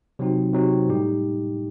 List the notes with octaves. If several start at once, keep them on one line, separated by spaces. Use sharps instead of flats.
C3 F#3 C4 D#4 F#4
C3 F#3 C4 D#4 F#4
A2 G3 D#4 G4